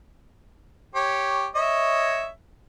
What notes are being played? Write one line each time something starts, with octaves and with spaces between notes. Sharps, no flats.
G4 C#5
C#5 D#5 E5